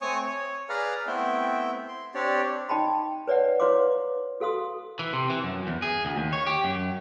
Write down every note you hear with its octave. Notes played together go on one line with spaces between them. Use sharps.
A3 C4 C#5 G#5 C#6 D#6
C#5
G#4 B4 D5 F5 A#5 F6
A3 B3 C4 E4 E5 G5
C6
C4 D4 G4 C#5 D5
D#4 D#5 G5 A5 B5 C6
B4 C#5 D5 E5 F#5
E4 B4 C#5 F5 C6 D6
F#4 A4 F5 C6 D#6
E3
C3
E3
F#2
E2
G#4
D2
D#2
C#5
G4
F#2